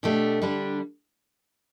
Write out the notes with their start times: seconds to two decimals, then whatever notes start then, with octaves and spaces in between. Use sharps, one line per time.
0.03 B2 A3 D4 G4
0.42 D3 G3 D4